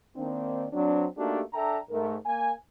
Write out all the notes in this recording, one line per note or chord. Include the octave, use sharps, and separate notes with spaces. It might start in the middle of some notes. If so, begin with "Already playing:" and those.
D#3 A#3 C4 D4
F#3 C4 D4
A3 A#3 D4 D#4 F#4 G4
D4 A4 E5 G5 A#5
G#2 A3 A#4
A#3 G#5